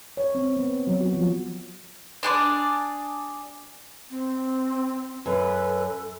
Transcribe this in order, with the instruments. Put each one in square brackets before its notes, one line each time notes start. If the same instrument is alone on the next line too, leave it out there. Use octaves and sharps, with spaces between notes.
[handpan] C#5
C4
B3
F#3
F#4
F3
[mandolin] D4 G#4 C5 D5
[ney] C4
[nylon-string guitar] F#2 [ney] A4 [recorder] B4